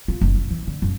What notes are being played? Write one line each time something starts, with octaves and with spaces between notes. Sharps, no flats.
F4
F#1
C#3
E3
D3
F#2